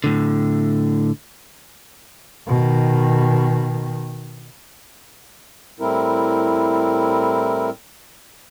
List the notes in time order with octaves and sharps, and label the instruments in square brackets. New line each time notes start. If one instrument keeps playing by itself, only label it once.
[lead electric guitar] A2 D3
[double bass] B2 D#3
[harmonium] A2 G3 C4 E4 A#4